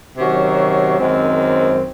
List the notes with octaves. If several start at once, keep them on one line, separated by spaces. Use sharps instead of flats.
C3 D#3 F#3 C#4 F#4
F#2 D#3 G#3 C4